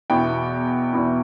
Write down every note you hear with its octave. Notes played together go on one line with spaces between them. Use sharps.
E2 B2 B3 E4 G5
E2 B2 B3 E4